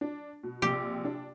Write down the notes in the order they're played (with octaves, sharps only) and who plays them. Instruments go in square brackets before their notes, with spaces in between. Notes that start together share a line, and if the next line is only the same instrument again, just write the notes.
[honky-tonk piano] D4
B2
[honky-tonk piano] A#1 C3 [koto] G4
[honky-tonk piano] D4